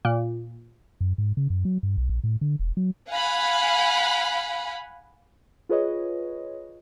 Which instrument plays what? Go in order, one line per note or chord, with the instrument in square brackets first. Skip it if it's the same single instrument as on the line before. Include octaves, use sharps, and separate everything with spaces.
[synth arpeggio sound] A#2
[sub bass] F#2
G#2
C#3
F#2
F#3
G2
B1
A#1
A2
D3
E1
F#3
[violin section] F5 F#5 G#5 B5
[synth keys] F4 G#4 B4 C#5 D#5